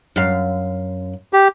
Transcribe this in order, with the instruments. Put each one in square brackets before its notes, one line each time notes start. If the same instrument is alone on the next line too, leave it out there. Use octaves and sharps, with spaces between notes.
[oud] F#2 F5
[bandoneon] G4